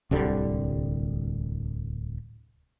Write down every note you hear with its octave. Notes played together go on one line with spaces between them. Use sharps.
D1 C2 D3 G3